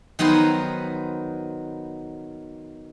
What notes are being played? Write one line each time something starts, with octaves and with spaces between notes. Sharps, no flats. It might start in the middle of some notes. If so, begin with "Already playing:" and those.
D#3 F#3 B3 D#4 C5